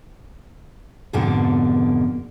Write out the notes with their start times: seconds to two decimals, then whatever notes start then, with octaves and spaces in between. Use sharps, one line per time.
1.13 F2 G#2 B2 D3 A#3 A4